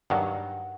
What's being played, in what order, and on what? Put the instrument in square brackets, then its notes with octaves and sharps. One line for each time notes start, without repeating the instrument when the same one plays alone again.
[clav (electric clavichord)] G2 D#3 F#3 [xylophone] F#5